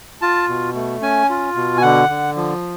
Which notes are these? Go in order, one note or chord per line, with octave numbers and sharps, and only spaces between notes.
F4 A5
B2
A3
C#4 G#5
F4
B2
G#5
D3 F#5
D3
F3